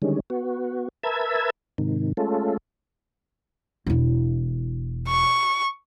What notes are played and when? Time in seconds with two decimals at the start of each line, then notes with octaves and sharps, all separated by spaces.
0.02 D3 D#3 G3 G#3 C#4
0.30 B3 F#4
1.03 A#4 B4 E5 A5 E6 G#6
1.78 G#2 C3 D#3
2.17 G#3 A3 C#4 F4 A4
3.86 E1 E4
5.08 C#6